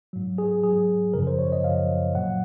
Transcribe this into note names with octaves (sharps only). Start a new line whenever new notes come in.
G#2 F#3
G#4
G#2 F#3 G#4
F#2 C#3 F3 A#4
C5
C#5
D#5
F#2 C#3 F3 F5
A#2 F#3 F#5